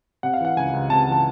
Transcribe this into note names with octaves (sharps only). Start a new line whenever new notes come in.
C3 F#5
F5
E3 F#5
C#2 G#5
C#2
C3 A5
E3
A5